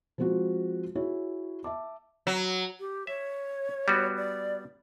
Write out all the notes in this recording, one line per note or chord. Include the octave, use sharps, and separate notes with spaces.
F3 G#3 C4 F4 F#4
E4 F#4 G#4 C#5
E5 A5 D6
F#3
G4
C#5 E5
G3 B3 F#4
D5